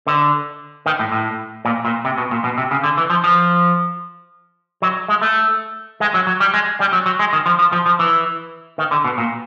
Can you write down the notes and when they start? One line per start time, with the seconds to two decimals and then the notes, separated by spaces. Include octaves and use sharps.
0.07 D3
0.86 D#3
0.99 A2
1.12 A2
1.65 A#2
1.85 A#2
2.05 C3
2.18 B2
2.31 A#2
2.44 B2
2.58 C3
2.71 C#3
2.84 D3
2.97 E3
3.10 F3
3.24 F3
4.82 F#3
5.08 G#3
5.21 A3
6.00 G#3
6.14 F#3
6.27 F#3
6.40 G3
6.54 G#3
6.80 G3
6.93 F#3
7.06 F#3
7.19 G#3
7.33 D#3
7.46 F3
7.59 F3
7.72 F3
7.86 F3
7.99 E3
8.78 D#3
8.91 D3
9.04 B2
9.18 A#2